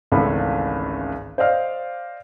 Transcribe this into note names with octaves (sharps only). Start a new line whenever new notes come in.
G#1 C#2 E3 A3 A4 B5
C5 D5 D#5 F5 F6